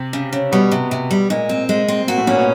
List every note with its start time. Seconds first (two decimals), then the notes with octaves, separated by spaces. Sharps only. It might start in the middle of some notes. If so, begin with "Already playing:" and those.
Already playing: C3 C4
0.13 C#3
0.32 C#3
0.52 B2 G3 B3
0.71 C3
0.91 C3
1.11 G3
1.30 A#2 G#3 A#3
1.49 C4
1.69 G#3
1.88 C4
2.08 A#2 A#3 F#4
2.18 A2 A3
2.27 A#2 A#3 C#4
2.37 B2 B3